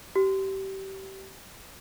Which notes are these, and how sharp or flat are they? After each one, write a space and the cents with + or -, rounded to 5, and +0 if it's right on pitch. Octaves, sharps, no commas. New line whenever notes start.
G4 -25